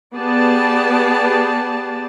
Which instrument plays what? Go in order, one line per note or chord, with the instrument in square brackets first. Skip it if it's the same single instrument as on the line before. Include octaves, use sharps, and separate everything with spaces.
[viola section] B3 G4 G#4 D5 A5